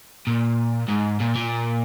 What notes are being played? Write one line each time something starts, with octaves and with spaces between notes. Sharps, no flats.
A#2
G#2
A#2
A#2